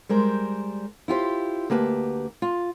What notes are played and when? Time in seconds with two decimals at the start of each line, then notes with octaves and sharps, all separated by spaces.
0.09 G3 G#3 A#4 C5
1.08 E4 F4 G4 C5
1.70 D2 A#3 G4 B4 A5
2.42 F4